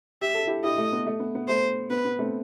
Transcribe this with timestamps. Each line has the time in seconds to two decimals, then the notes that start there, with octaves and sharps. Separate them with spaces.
0.21 G4 E5
0.34 A4
0.47 E4 G4
0.64 E4 G4 D#5
0.78 A3
0.92 B3
1.07 A3
1.20 B3
1.35 B3
1.48 A3 C5
1.90 B3 B4
2.05 B3
2.19 A3 C4